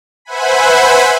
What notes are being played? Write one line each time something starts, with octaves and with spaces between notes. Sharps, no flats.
B4 C5 E5 F#5 G#5 B5